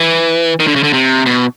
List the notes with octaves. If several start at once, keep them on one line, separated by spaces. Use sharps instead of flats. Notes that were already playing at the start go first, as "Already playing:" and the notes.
Already playing: E3
D#3
D3
C#3
D3
C3
B2